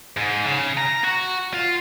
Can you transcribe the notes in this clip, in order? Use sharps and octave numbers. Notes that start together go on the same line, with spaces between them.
G#2
C#3
A#5
F#4
F4